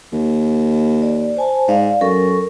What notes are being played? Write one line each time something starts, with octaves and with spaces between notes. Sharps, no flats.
D#2
D5
C5 G#5 A5
G#2 D5 F5
F#2 A4 A#4 C#6